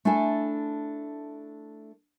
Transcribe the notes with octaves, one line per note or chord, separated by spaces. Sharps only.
A3 D4 E4 A4 G#5